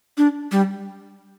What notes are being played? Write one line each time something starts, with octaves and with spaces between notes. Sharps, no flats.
D4
G3